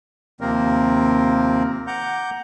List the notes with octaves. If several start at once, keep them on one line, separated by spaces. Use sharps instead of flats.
D#2 C3 F3 A#3 C4 A#4
F#5 A#5 D6 G6